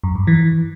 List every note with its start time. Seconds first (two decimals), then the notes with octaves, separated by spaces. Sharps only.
0.04 F#2
0.15 G2
0.27 E3